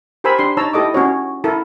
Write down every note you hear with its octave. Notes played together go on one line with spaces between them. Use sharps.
G4 A#4 C5 G#5 B5 E6
D4 G4 C6
D#4 C#5 A5 A#5 E6
E4 G4 A4 D#5 D6
C#4 F#4 C#5
E4 A4 A#4